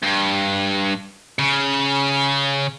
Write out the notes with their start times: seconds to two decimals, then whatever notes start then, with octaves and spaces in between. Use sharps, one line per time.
0.03 G2
1.39 C#3